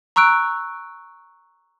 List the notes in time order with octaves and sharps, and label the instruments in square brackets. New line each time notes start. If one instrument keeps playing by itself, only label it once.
[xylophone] A#5 C#6 E6 F#6 D7